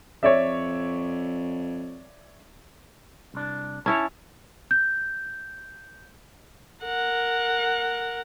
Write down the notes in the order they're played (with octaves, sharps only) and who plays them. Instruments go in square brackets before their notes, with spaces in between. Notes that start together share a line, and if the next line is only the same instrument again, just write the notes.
[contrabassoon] F2 [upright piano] C#5 D5 E5
[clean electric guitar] C2 D4
[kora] C#4 E4 C#5 [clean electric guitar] G#5 A5
[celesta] G6
[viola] A#4 F#5